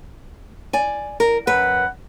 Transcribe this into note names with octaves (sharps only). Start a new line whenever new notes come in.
D5 G#5
A#4
F#2 B4 F#5